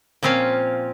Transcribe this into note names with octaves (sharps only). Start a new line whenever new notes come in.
A#2 F3 C4 C#4 F5